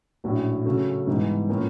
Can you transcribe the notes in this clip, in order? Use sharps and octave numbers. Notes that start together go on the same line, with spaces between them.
A#1 A2 F#3 A3 C#4
C#3 F#3 A3 C#4 F#4
G#2 E3 G3 B3
A2 F3 A#3 C#4